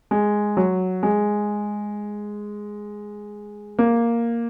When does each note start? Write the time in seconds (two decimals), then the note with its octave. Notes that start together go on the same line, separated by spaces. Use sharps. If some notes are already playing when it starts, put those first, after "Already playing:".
0.11 G#3
0.57 F#3
1.03 G#3
3.79 A#3